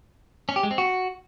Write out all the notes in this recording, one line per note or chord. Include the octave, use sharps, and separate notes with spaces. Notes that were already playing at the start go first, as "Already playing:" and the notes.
C#4
G4
G#3
C4
F#4